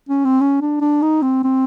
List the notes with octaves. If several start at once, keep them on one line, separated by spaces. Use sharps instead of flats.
C#4
C4
C#4
D4
D4
D#4
C4
C4